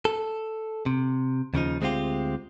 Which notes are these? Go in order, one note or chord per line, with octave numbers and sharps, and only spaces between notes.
A4
C3
D#2 C#3 F3 D#4
D2 G#3 C4 C#4 F4 G4